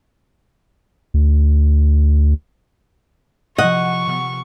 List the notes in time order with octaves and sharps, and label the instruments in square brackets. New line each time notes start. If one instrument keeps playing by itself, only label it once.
[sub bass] D2
[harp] C3 F3 [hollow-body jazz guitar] D#5 [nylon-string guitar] F#5 [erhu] C#6
[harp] C3 B3 F6